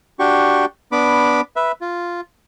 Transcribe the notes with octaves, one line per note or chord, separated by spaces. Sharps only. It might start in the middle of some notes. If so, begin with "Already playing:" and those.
D4 F#4 G4 C#6
B3 D4 B5 D6
B4 E5
F4